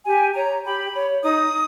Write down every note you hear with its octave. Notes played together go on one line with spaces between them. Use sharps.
G4 G#5
C#5 A#5
G4 B5
C#5
D#4 D#6